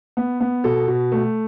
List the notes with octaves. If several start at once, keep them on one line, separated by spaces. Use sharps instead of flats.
B3
B3
B2 A4
B2
A3